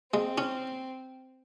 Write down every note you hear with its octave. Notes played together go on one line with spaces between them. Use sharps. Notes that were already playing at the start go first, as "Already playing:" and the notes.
G#3 C4
C#4